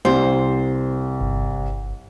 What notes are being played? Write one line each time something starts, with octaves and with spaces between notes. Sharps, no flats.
C2 C5
G1